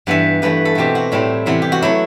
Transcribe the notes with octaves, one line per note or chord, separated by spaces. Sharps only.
G2 E3 B3 E5
G2 E3 A3 B4
A4
B2 A3 C4 G4
F#4
A2 G3 C4 E4
C3 E3 B3 E4
G4
F#4
F#3 A3 E4